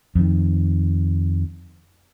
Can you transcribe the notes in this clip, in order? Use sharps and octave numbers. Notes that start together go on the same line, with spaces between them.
F2 D#3